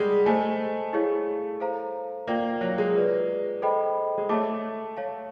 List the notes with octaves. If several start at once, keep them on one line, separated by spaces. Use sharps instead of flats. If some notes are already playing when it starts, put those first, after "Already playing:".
Already playing: G3 G#3 D#4 G4 A#4 F#5
A3 C5 D#5 G#5
E4 G#4 C#5 F5
A4 C5 F5 A#5
A#3 F4 A#4 D5 G5
F#3
G#3
F4 G#4 B4 D5
A4 C5 D#5 G5 B5
G#3
A3 C#5 E5 A5 D6
C#5 F5 A5